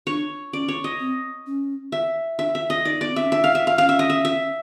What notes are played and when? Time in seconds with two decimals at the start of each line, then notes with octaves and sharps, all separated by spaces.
0.07 D4 C#5
0.53 C#4 D5
0.68 C#5
0.84 D#5
0.99 C4
1.47 C#4
1.92 E5
2.39 D4 E5
2.55 E5
2.70 D#5
2.85 D#4 D5
3.01 B3 D5
3.12 C4 E5
3.22 C#4
3.31 D4 E5
3.44 F5
3.55 E5
3.67 F5
3.78 C#4 F5
3.89 E5
3.99 D#5
4.10 E5
4.25 E5